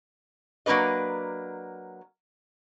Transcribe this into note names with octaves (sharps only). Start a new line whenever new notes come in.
F#3 A#3 D4 B4 D#5